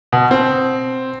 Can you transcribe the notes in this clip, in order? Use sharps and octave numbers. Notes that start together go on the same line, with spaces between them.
B2
C4